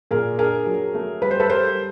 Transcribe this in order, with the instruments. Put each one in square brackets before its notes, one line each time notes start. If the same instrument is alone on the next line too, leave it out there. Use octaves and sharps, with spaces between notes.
[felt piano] A#2 G#4 A#4
D4 G#4 A#4
F#3
A3
G3 B4
C5
A4 B4
G3 A#4 C5